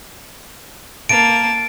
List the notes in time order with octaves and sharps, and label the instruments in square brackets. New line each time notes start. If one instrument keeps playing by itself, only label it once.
[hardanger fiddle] A#3 A5 [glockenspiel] D7